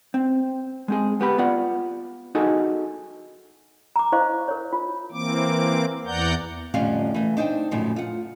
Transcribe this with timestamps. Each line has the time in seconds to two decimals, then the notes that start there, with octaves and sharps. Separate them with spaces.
0.14 C4
0.88 G#3 C4 G#4
1.21 B3 G4 B5
1.38 B3 F4 D5 F#5
2.35 D#4 F#4 G#4 A4
3.96 A#5 D6
4.12 E4 C5 D#5 F5 A#5 C#6
4.48 A#4 C#5
4.73 F4
5.12 E3 A#3 C4 D6
6.06 E2 E3 D5 F#5 A#5 G6
6.74 F2 A2 D3 G3 C#4 F5
7.14 E3 A3
7.37 D4 D#4 C5 G5
7.71 F#2 A2 C#3 F3
7.96 F4 F#5